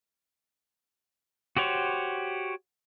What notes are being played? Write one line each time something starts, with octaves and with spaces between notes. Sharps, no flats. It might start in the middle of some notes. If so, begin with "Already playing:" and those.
F#4 G4 C5 C#5